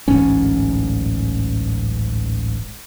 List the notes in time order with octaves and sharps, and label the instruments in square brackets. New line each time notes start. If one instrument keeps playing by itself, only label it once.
[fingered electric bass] D1 A1 G#2 C#4